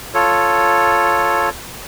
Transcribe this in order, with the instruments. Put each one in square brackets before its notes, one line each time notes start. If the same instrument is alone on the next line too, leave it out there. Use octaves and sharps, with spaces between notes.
[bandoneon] F4 A4 C#5